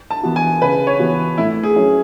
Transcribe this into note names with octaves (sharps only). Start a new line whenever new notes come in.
A5
E3 B3 F#4
G#5
C#3 B4
C#5
E3 B3 F#4
A2 E4
G#4
F#3 C#4 E4